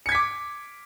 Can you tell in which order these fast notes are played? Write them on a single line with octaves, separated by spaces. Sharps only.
C#7 G#6 B6 D6